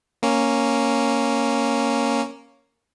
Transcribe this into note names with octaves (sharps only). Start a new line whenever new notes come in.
A#3 C#4